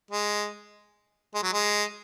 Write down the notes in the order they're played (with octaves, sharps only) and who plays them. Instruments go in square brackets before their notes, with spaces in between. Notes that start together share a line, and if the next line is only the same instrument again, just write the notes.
[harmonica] G#3
G#3
F#3
G#3